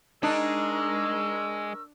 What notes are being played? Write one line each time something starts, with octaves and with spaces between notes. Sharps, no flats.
G#3 D4 D#4 G#4 A#4 C#6 E6